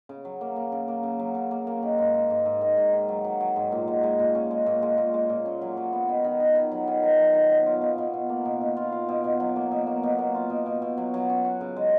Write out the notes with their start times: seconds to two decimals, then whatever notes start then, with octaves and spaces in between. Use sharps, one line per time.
0.09 C#3
0.25 F#3
0.41 A#3
0.56 A#3
0.72 C#3
0.88 A#3
1.03 C#3
1.19 F#3
1.35 C#3
1.51 A#3
1.67 A#3
1.83 D#3
1.98 G#2
2.14 G#2
2.30 G#2
2.46 G#2
2.61 D#3
2.77 G#2
2.93 D#3
3.09 F#3
3.25 F#3
3.41 F#3
3.56 G#2
3.72 A#2
3.88 G#3
4.03 G#3
4.19 A#2
4.35 C#4
4.51 G#3
4.66 A#2
4.82 G#3
4.98 A#2
5.14 G#3
5.29 A#2
5.46 C#4
5.61 F#3
5.77 F#3
5.93 B3
6.09 D#3
6.24 D#3
6.40 D#3
6.56 D#3
6.71 F#3
6.88 D#3
7.03 D#3
7.19 F#3
7.34 D#3
7.50 B2
7.67 F4
7.82 B2
7.98 B2
8.14 B2
8.29 A#3
8.45 B2
8.61 B2
8.77 F4
8.92 F4
9.09 B2
9.24 B2
9.40 F#3
9.56 A#3
9.71 B2
9.87 A#3
10.03 B2
10.19 A#3
10.35 F4
10.50 B2
10.66 B2
10.82 B2
10.98 F#3
11.14 F#3
11.30 C#4
11.45 F#4
11.61 C#3
11.76 G#3